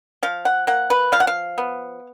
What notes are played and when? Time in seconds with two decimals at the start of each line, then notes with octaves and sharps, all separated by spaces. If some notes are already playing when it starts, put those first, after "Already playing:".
0.23 F3 F5
0.45 F#5
0.67 A#3 F#5
0.90 B4
1.12 F3 F5
1.20 F#5
1.27 F5
1.58 B3